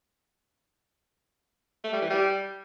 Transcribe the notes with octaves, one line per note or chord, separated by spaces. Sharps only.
A3
G3
E3
G3